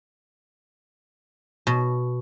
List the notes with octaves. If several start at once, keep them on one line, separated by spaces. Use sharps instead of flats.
B2